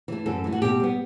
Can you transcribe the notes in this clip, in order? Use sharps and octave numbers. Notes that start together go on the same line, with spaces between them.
E3 A3
F#2 A4
E3 A3
F#4
B2 G4
G3 B3